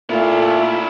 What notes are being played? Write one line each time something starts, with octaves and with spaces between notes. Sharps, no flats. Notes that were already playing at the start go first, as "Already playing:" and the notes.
A#2 A3 E4 F4